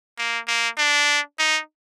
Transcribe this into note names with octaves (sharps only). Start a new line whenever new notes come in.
A#3
A#3
D4
D#4